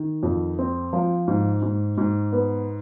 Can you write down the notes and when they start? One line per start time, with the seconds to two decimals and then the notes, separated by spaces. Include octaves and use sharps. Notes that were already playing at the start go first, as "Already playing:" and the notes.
Already playing: D#3
0.23 F2
0.59 C4
0.93 F3
1.28 G#2
1.62 G#2
1.98 G#2
2.33 B3